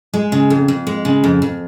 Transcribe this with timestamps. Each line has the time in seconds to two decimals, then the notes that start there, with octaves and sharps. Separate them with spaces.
0.14 G#3
0.32 C#3
0.50 F2
0.68 F2
0.87 G#3
1.05 C#3
1.24 F2
1.42 F2